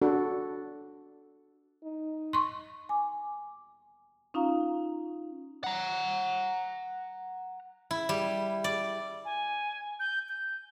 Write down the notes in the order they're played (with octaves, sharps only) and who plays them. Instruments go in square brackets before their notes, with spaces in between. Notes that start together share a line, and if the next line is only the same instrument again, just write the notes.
[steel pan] D4 F#4 A4
[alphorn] D#4
[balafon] C6 C#6
[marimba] G#5 D6
C#4 D#4 F4 F5 A#5
[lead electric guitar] F#5 A#5
[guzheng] E4
G3
D5
[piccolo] G#5
G6
G6